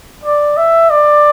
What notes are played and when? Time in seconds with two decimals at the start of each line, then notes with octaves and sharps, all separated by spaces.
0.24 D5
0.57 E5
0.90 D5